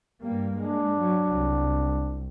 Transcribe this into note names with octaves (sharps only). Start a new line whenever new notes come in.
G2 G3 A#3
G#3 D4
F#3
C2